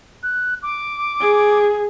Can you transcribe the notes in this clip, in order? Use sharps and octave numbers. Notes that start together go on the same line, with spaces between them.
F#6
D6
G#4